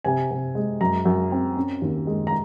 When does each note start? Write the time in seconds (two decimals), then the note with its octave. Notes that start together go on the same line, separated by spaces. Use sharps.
0.04 C3 G#5
0.31 C3
0.55 G#3
0.81 F#2 A#5
1.05 F#2
1.32 C4
1.57 C#4
1.82 D#2
2.07 G#3
2.27 A#5